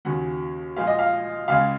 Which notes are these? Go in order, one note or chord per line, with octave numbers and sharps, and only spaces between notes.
D#2 C#3 F#3 F#5
A#2 F3 G#3 F5
D#5
F5
C#2 C#3 G#3 F5